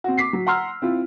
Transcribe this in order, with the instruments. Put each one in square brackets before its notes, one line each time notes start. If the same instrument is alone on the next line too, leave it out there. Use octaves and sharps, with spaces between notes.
[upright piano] C4 F#4
D6 B6 C7
F#3
F#5 A#5 C6 E6 F6
C4 E4 F4